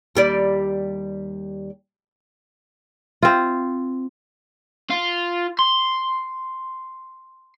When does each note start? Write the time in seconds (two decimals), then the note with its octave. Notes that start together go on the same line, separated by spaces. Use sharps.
0.15 D#2 G3 D5
3.22 C4 F4
4.90 F4
5.59 C6